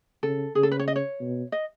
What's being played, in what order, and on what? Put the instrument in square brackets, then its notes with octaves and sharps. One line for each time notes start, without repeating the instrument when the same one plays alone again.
[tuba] C#3 [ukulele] A4
[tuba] C#3 [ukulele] G#4
[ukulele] A4
B4
C#5
D#5
C#5
[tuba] B2
[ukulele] D#5